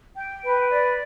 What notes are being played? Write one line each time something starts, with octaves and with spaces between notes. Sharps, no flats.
G5
B4
D5